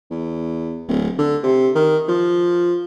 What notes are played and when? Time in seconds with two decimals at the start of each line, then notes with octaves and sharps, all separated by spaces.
0.11 E2
0.87 D1
1.18 D3
1.43 C3
1.75 D#3
2.08 F3